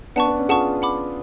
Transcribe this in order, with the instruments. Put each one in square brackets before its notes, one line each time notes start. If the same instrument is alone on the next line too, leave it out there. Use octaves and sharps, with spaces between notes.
[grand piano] B3 D4 [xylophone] F#5 A5 C#6
[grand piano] B3
C#4
[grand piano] F4 G#4 [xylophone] F#5 A5 C#6
[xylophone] F#5 B5 D6